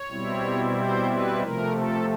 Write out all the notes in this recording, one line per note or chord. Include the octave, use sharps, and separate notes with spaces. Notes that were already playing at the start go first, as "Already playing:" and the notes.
Already playing: C#5
B2 G3 C4 E4
C5
B4
C3 F3 A3 A#4
A4